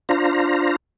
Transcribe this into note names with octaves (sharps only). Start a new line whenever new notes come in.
D4 F4 C5 A#5